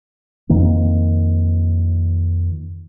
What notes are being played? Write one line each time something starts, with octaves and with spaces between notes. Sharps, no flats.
F2 D#3 A#3 C4